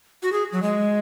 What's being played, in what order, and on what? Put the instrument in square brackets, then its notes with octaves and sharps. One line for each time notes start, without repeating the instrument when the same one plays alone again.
[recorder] F#4
G#4
F#3
G#3